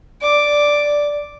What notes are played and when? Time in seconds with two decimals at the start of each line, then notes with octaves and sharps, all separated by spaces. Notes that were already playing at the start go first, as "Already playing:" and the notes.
0.22 D5 D6